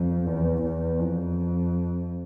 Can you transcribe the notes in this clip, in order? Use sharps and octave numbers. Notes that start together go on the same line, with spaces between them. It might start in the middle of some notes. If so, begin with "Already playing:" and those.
Already playing: F2
E2
E2
F2